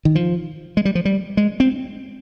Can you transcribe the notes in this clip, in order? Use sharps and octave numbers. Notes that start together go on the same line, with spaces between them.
D#3
F3
G#3
G3
F3
G3
G#3
C4